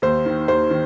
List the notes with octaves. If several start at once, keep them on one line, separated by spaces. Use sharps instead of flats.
D#2 C5
D#3
D#2 C5
D#3